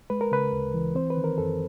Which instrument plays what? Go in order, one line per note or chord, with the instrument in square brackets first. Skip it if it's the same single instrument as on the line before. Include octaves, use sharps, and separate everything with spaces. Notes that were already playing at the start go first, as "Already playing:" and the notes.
[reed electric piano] G#3 B4
A#4
C#3 B4
D2
E3
C4 C5
B4
D#3
A#4
F#2 A4